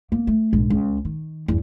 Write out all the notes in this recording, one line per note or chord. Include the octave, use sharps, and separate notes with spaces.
A#3 B3
A3
A#1 G#2
C#2
D#3
E2 G2